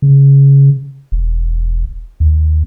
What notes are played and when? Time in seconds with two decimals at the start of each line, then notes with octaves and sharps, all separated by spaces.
0.02 C#3
1.12 E1
2.20 D#2